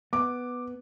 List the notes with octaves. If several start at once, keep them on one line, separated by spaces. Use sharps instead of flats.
B3 D6